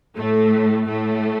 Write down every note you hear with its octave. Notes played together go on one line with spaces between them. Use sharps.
A2 A3
A2 A3